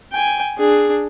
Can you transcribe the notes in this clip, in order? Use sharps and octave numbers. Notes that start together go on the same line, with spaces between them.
G5 G#5
D4 G#4